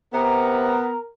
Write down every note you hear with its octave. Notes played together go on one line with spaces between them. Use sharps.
C3 B3 A#4 A#5